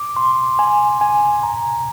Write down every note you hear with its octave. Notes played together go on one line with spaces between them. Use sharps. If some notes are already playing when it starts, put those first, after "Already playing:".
Already playing: D6
C6
G#5
G#5
A#5